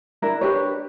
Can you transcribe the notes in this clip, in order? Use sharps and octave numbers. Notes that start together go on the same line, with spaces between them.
D4 E4 A#4
D4 G4 B4 C#5